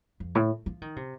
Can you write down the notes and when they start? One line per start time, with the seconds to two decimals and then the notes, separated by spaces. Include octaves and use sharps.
0.20 F2
0.35 A2
0.66 F3
0.82 D#3
0.96 C3